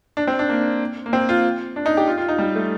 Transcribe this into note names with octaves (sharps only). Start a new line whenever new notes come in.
D4
C4
D4
A#3
A#3
C4
F4
D4
D#4
G4
F4
F4
D#4
G3
A3